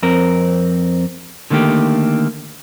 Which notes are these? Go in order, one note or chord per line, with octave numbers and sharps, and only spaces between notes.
F2 C4 A#4
D3 D#3 A3 A#3 G4